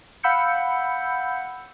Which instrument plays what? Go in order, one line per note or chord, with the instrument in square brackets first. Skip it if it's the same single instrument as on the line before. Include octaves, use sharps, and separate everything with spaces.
[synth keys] F5 F#5 B5 E6 G6 C#7